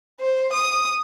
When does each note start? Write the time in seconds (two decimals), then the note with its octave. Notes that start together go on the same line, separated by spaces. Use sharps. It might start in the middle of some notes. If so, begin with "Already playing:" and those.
0.20 C5
0.53 D#6